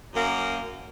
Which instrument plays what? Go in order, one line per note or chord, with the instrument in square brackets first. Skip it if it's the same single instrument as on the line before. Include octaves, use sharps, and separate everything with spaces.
[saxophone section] F#2 A#3